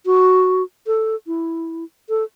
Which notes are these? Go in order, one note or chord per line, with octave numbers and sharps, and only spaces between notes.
F#4
A4
E4
A4